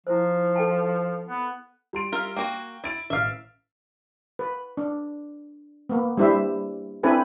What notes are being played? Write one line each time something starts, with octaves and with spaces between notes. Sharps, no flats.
F3 E4 C5
A4 G5 A5
B3
G3 C6 D7
F4 A#4 E5
A#3 F#4 G5
E4 A6 D7
A1 E5 F5
B4
D4
A#3 B3
G3 D4 E4 C5 E5
C4 D4 E4 A4 B4 G#5